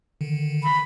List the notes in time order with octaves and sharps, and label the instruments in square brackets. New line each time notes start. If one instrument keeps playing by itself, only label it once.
[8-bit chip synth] D3 D#3
[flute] B5